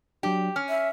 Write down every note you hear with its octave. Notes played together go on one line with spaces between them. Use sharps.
F#3 D4 G4
C#4 F6
E5